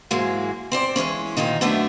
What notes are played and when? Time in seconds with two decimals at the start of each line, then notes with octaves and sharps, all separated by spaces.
0.11 G#2 E3 F#3 G#3 A#3
0.72 C4 C5 D5
0.96 F2 E3 G#3 C#4
1.37 D2 G2 A#2 D#3 D#4
1.61 F#2 D3 A3 B3 D4 E5